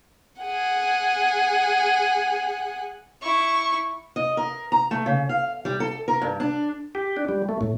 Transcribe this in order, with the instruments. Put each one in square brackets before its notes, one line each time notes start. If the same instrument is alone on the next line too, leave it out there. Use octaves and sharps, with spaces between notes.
[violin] G#4 F#5
[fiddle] E4 C#6
[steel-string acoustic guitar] D#5
A#4
A#5
A3
C#3
F5
G3
A4
A#4
G2
D4
[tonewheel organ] G4
D4
G3
A3
A2